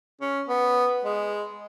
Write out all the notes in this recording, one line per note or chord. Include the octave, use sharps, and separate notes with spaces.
C#4
B3
G#3